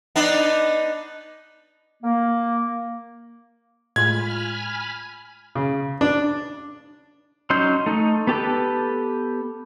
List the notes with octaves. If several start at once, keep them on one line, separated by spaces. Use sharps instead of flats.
B3 D4 D#4
A#3
A2 G#3 F4 G#5 B5 F6 G#6
C#3
D4
F#3 C#4 D#4 C6 G6
A3 D#4
B3 G4 A4 B4